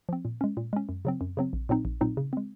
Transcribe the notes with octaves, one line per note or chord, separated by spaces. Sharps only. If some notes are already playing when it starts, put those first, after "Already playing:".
F3 C4
A#2
G#3 C#4
A#2
G#3 C#4
F#2
C#3 F#3 C4
F#2
C#3 F#3 C4
A#1
A#2 F#3 C4 D#4
A#1
A#2 F#3 C4 D#4
C#3
G#3 C4